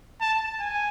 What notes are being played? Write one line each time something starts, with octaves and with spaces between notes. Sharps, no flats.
A5
G#5